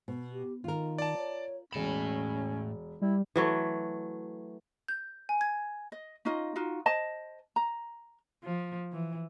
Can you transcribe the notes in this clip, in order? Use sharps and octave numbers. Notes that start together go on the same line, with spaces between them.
B2
G4
D#3 F4 A#4
D5 A5
C#5
E1 A2 C#4 B5 E7
G3 E4
E3 F#3 A3
G6
G#5
G#6
D#5
C#4 D#4 F4 D#5
D#4 F4 F#4
C5 D#5 A5
A#5
F3
E3